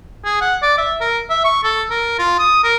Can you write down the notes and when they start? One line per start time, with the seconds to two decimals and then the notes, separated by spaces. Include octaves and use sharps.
0.25 G#4
0.41 F#5
0.62 D5
0.78 E5
1.01 A#4
1.30 E5
1.44 C#6
1.64 A4
1.90 A#4
2.19 F4
2.39 D#6
2.64 A#4